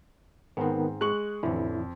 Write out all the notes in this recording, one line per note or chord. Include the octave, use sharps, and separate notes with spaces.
G#2 D#3 B3 C4 B4
G#3 C#6 F#6 F#7
A1 F2 D3 E4